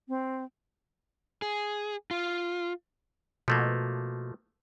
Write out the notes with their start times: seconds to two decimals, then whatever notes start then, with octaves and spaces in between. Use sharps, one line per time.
0.08 C4
1.42 G#4
2.11 F4
3.48 B2 F3 A3 A#3